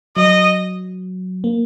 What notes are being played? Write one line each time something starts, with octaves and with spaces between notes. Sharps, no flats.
F#3 D#5
A#3